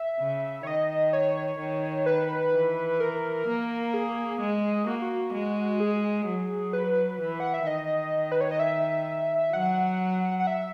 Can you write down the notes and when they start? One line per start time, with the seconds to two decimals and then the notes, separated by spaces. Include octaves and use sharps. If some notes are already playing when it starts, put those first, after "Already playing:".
Already playing: E5
0.20 C#3
0.63 C#5
0.66 D#3 D#5
1.13 C#5
1.60 D#3
2.06 B4
2.53 E3
3.00 A#4
3.47 A#3
3.94 G#4
4.40 G#3
4.87 A#3 F#4
5.02 F#4
5.33 G#3
5.80 G#4
6.27 F#3
6.73 B4
7.20 E3
7.40 F#5
7.54 E5
7.66 D#3 D#5
8.32 B4
8.41 C#5
8.51 D#5
8.60 E5
9.53 F#3 F#5
10.39 F#5
10.47 E5